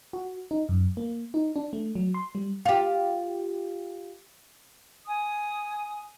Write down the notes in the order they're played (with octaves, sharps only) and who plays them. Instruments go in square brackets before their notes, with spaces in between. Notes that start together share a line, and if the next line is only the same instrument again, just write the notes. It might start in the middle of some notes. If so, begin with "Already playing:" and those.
[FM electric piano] F#4
D#4
F#2
A#3
D#4
D4
A3
F#3
C6
G3
[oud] F4 G4
[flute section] G#5 D#6